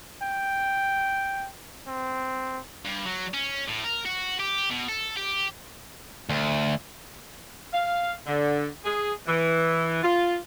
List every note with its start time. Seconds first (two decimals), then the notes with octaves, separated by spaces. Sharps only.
0.22 G5
1.87 C4
2.85 G2
3.05 F#3
3.34 C#4
3.68 A2
3.85 A#4
4.06 F#4
4.39 G4
4.70 B2
4.88 A4
5.17 G4
6.29 D2
7.73 F5
8.27 D3
8.85 G#4
9.27 E3
10.03 F4